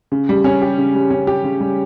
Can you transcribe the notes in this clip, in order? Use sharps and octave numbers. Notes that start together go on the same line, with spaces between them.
C#3
G3
C#4
G4
C#3
G3
C#4
G4
C#3
G3